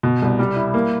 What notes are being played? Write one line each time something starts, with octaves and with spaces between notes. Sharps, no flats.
B2
C2
G3
E4
A#3